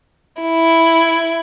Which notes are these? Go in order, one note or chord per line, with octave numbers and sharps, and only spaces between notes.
E4